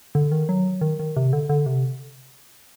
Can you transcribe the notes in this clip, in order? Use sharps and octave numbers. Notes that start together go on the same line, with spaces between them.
D3
D#3
F#3
D#3
D#3
C3
D3
D3
C3